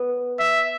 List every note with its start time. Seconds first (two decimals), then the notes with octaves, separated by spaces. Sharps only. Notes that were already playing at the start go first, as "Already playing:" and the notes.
Already playing: B3
0.39 E5